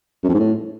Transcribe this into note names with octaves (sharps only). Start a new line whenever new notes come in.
F#2
F2
G#2
A2